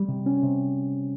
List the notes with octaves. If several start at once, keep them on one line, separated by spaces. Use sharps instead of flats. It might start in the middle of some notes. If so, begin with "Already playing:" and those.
Already playing: G3
C3
C#4
C3